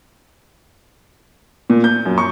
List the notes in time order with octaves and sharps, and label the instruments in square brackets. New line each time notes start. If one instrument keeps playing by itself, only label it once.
[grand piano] A#2
G6
F#2
C#6